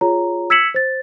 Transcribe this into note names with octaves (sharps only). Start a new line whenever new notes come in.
F4 G#4 C#5 A#5
E6 G#6 B6 C#7 E7 F#7
C5 A6